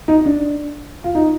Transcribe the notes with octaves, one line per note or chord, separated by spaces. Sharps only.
D#4
D4
F4
D#4